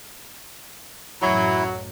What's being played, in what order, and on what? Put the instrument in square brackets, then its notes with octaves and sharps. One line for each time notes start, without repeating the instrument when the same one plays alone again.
[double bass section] A1 F#2 [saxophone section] F#3 [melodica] E4